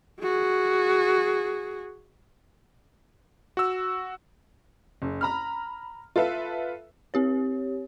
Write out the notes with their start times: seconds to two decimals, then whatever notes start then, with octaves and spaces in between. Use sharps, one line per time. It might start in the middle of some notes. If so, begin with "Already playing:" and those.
0.21 F#4 G#4
3.57 F#4 E6
5.02 F#1
5.21 A#5 B5 F6
6.16 F4 A4 B4 E5
7.14 C4 G4 C#5